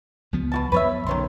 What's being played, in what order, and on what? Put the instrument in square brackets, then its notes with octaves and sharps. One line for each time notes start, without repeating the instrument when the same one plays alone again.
[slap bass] C#2 F3 B3
[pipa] B2 F#4 A5
[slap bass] F#2 F3 B3 [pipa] B4 C#5 E5
[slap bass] B1 F#2 D3 [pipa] D#3 C#5 C6